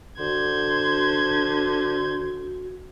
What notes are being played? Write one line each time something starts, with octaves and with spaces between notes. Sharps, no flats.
D3 F#4 C5 G#6